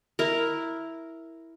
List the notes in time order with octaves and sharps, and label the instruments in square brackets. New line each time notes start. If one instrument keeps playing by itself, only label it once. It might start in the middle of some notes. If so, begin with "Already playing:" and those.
[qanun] E4 A#4